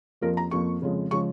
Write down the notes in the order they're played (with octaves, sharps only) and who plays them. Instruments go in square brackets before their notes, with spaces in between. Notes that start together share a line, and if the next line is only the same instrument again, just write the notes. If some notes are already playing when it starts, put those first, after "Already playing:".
[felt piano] F2 F3 A#3 A#4
A#5
F2 F3 A#3 C#6
F2 C#3 F3 G#3
C#3 F3 G#3 C#6